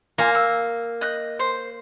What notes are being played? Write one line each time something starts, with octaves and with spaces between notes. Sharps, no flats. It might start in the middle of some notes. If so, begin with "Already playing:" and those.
A#3 F4 G#5
E6
D#5 F#6 G6
C5